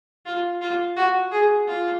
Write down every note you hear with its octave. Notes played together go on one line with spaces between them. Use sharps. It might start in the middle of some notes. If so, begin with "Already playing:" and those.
F4
F4
F#4
G#4
F4